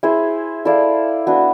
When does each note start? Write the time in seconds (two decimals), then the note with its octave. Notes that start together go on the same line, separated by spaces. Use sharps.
0.03 E4 G#4 C5
0.65 E4 A4 D5 F5
1.27 B3 D4 F#4